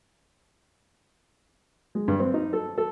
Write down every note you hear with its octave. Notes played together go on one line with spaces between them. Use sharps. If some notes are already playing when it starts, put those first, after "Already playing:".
G#3
G2
C4
D#4
A4
A4